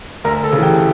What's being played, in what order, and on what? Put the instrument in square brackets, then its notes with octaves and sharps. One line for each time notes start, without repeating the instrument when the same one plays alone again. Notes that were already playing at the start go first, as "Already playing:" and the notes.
[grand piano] D2 A#4 A#5
A4 A5
C#3
E3 G4 G5